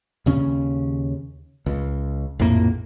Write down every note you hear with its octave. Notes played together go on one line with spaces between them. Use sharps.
D#2 C#3 C#4
C#2
A#1 F2 A2 A#3